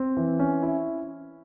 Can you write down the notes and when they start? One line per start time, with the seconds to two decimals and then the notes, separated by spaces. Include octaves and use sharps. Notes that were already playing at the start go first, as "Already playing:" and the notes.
Already playing: C4
0.17 E3
0.40 C#4
0.62 E4